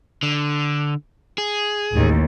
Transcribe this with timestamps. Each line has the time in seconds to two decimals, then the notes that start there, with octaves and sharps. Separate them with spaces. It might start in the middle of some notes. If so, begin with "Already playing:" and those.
0.23 D3
1.38 G#4
1.93 A1 D#2